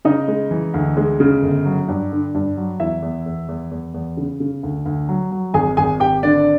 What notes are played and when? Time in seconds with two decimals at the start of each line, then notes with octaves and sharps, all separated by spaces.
0.05 C#3 D#4 D#5
0.28 G#3
0.51 E3
0.74 D2
0.97 G#3
1.20 C#3
1.42 G1
1.66 F#3
1.88 G2
2.12 D3
2.35 G2
2.57 F#3
2.80 E2 E4 E5
3.02 E2
3.26 E2
3.49 E2
3.71 E2
3.94 E2
4.17 C#3
4.40 C#3
4.63 D2
4.86 D2
5.09 F#3
5.31 F#3
5.54 G#1 G#4 G#5
5.77 G#1 G#4 G#5
6.00 G#1 G4 G5
6.23 D3 D4 D5